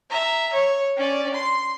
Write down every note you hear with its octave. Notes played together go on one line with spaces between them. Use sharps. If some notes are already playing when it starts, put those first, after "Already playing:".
E5 A#5
C#5
C#4 D5
C6